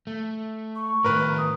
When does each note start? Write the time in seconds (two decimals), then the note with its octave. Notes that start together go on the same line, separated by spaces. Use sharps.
0.07 A3
0.75 C#6
1.04 A2 D#3 A#4 B4
1.37 D#6